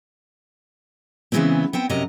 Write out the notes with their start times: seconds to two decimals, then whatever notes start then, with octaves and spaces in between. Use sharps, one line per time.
1.32 C#3 E3 F#3 G#3 B3 C4
1.73 B3 C4 G5
1.89 F#2 C3 F#3 A#4 D#5 A#5